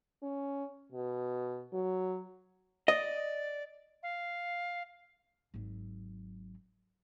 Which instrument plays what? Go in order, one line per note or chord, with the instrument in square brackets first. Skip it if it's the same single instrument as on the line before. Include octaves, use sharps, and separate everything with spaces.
[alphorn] C#4
B2
F#3
[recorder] D5 [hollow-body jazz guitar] D#5
[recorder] F5
[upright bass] G#1 F#3